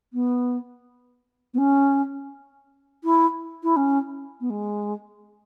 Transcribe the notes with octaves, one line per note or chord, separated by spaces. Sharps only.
B3
B3
C#4
E4
E4
C#4
B3
G#3